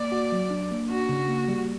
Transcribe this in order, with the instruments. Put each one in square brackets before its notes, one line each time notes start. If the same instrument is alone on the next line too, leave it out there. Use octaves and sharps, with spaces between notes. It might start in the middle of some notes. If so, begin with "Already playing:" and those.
Already playing: [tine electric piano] A#3 [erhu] D5
[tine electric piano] F#4
F#3
D4
A#3
[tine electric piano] D4 [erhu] F#4
[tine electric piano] C#3
A#3
G3